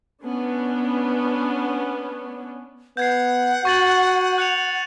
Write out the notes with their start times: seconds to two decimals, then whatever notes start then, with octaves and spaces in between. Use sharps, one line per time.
0.23 B3 C#4 D4
2.97 B3 F#5 G6 G#6 C7
3.65 F#4 C#6 A6 F#7
4.38 F#6 C#7 F7